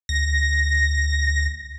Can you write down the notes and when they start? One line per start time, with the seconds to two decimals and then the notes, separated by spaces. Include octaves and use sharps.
0.09 D2 A#6